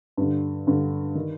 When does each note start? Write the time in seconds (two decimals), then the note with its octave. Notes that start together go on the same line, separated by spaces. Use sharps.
0.17 G2 D3
0.67 G2 D3
1.15 D#3